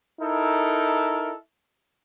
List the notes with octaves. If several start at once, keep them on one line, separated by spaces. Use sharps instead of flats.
D#4 E4 A4 A#4